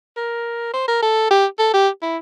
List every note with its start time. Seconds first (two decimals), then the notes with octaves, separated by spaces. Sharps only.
0.17 A#4
0.74 C5
0.88 A#4
1.02 A4
1.31 G4
1.59 A4
1.74 G4
2.02 E4